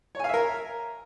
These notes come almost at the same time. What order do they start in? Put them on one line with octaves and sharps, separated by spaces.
C#5 G#5 F5 E5 A#4